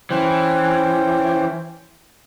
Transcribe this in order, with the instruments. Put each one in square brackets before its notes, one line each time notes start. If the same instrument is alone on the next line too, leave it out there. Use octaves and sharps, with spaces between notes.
[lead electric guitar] E3 [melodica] C#4 C5 G5